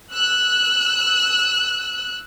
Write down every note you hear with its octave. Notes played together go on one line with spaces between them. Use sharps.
E6 F#6